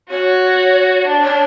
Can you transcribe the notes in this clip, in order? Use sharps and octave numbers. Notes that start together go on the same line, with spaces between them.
F#4 C#5
D4
C#5